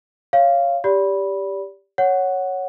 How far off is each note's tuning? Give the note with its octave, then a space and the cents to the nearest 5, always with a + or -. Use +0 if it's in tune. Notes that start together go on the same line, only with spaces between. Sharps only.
C#5 +0 F5 -10
G4 +10 D5 -35 B5 -10
C#5 +0 F#5 +0